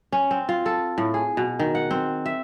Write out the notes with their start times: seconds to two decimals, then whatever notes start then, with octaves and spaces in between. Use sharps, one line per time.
0.12 C#4
0.31 C4
0.49 F4
0.66 A4
0.98 A2
1.14 G#4
1.37 B2
1.60 D#3
1.75 F#5
1.91 C4
2.26 E5